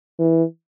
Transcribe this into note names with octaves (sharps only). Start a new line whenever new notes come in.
E3